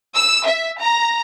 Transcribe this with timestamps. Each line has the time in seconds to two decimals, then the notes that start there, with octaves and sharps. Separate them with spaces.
0.15 E6
0.44 E5
0.80 A#5